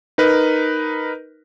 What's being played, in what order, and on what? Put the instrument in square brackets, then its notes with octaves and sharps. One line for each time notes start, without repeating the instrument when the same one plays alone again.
[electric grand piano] D#4 A#4 B4